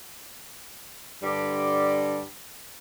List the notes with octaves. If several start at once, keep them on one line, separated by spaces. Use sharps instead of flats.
G2 D3 G3 G4 D5